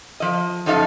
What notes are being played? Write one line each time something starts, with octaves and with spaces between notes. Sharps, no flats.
F3 D#5
F#2 F3 D#4 A4 F5